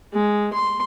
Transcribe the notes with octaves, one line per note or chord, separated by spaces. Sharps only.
G#3
C6